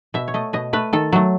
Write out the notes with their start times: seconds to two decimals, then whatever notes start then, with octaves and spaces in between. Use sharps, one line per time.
0.14 B2 E5
0.28 C#5
0.34 A3 D#5
0.53 B2 D#5
0.73 A3 B4
0.93 D#3 A4
1.12 F#3 A3